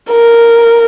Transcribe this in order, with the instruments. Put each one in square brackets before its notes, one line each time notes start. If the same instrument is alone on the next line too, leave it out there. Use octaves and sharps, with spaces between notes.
[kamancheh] A#4